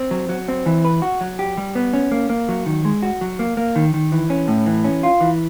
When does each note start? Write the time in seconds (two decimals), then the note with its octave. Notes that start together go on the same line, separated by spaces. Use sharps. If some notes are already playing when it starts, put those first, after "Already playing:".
Already playing: C4
0.11 F#3
0.29 F#3
0.48 C4
0.66 E3
0.85 B4
1.02 F#4
1.21 F#3
1.39 G4
1.58 G3
1.75 B3
1.93 C#4
2.11 A#3
2.30 A#3
2.49 F#3
2.66 D#3
2.85 G#3
3.03 F#4
3.21 F#3
3.39 A#3
3.57 A#3
3.76 D#3
3.94 D#3
4.12 E3
4.30 C#4
4.48 A2
4.66 E3
4.84 C#4
5.03 F4
5.21 E3